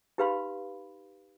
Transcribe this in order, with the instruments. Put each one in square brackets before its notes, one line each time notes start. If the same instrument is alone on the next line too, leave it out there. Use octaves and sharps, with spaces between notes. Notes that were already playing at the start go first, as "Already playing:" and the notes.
[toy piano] D#4 G4 B4 F5 B5 C6